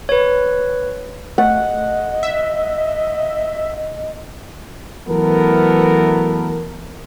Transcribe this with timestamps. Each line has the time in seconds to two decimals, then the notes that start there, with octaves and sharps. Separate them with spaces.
0.09 B4 C#5
1.38 A3 D#5 F#5
2.23 E5
5.08 E3 F#3 A3 B3 A4 A#4